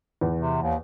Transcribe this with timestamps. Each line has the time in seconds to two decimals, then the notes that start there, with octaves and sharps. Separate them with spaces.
0.21 E2
0.40 C3
0.62 D#2